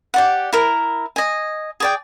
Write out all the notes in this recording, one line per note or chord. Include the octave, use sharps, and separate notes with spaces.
G4 D5 F#5
E4 A#4
D#5 G#5
G#4 D5 G5